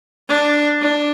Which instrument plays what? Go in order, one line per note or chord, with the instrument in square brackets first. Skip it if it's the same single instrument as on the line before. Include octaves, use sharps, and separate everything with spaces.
[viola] D4
D4